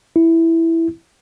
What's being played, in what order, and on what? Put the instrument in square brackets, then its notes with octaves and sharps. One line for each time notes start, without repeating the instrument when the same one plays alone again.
[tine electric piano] E4